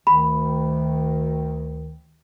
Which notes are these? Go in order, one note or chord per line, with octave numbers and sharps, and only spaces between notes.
D2 D#3 B5